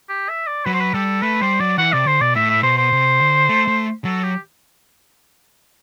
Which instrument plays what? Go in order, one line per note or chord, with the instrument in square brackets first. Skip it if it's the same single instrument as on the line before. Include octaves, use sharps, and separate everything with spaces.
[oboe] G4
E5
D5
[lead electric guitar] F#3 [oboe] B4
[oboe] C5
B4
[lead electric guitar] G3 [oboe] A4
[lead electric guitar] A3 [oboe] B4
[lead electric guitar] G3 [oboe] C5
[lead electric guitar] F#3 [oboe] D5
[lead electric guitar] E3 [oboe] F#5
[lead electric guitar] C3 [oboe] D5
[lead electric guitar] D3 [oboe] C5
[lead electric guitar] B2 [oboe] D5
[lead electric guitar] A2 [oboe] E5
[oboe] E5
[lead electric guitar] B2 [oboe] C5
[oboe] C5
[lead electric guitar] C3
D3
A3
A3
[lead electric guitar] F#3 [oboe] A4
[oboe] G4